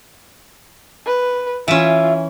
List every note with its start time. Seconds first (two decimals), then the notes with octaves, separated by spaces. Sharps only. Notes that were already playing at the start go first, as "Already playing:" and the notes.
1.06 B4
1.68 E3 C#4 F4 E5